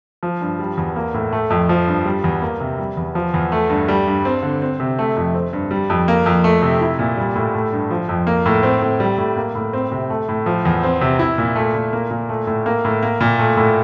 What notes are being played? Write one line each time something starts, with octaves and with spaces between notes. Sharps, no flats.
F3
G2
G3
E2
A#3
A2
A3
F2
F3
G2
G3
E2
A#3
C3
G3
E2
F3
E2
A3
G2
G3
G2
C4
D3
C4
C3
A3
F2
C4
G2
G3
F2
A#3
F2
A3
C3
E4
A#2
G3
A2
A3
G2
F3
F2
A#3
A2
C4
A2
G3
A2
A#3
A2
C4
C3
A3
A2
F3
E2
C4
C3
E4
A#2
A3
A#2
A#3
A#2
A3
A2
A#3
A2
A#3
A#2
A3
A2